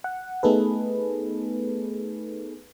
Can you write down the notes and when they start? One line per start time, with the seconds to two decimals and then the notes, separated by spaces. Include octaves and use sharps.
0.04 F#5
0.43 A3 B3 D#4 G#4 A4 B4